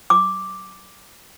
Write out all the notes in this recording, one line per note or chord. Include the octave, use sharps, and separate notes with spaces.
D6